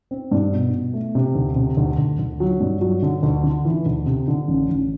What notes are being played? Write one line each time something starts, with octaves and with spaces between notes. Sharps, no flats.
C4
G2
B2
B2
A3
C3
D2
C3
D2
D2
D2
F#3
G2
F#3
D3
D2
D3
E3
D2
C3
D3
A1
A1